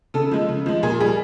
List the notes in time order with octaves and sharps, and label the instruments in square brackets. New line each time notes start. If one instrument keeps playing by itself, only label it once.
[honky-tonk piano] C#3 A4
F3 G#3
C#3
F3 G#3
A#2 G#4
G3 G#4